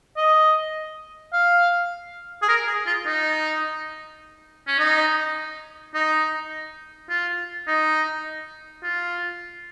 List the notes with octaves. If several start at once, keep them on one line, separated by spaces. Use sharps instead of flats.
D#5
F5
G#4
A#4
G#4
F4
D#4
C#4
D#4
D#4
F4
D#4
F4